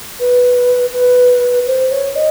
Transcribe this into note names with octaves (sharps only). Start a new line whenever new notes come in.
B4
B4
C5
C#5
D#5